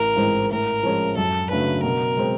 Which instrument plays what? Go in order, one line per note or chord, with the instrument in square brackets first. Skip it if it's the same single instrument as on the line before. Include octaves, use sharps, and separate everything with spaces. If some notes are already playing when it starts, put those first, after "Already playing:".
Already playing: [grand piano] A1 [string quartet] A#4
[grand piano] G#2 E3 G#3 C4
[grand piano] A2 [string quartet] A#4
[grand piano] F3 G#3 C#4
[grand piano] F#2 [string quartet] A4
[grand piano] C#3 F#3 A3 D4 [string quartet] B4
[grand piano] B2 [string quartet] A#4
[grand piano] G#3 C4